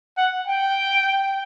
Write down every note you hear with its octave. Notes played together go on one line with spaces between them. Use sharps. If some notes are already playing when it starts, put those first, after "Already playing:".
F#5
G5